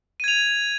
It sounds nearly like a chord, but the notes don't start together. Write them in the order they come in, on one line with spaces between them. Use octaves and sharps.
D#7 G#6 F7